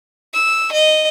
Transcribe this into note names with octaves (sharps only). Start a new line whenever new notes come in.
E6
D#5